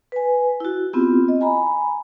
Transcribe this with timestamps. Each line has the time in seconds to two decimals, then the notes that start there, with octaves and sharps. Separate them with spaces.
0.12 B4 G#5
0.60 E4 F#4
0.93 B3 C4 E4 F4 G4
1.28 D#5
1.41 G#5 A#5 B5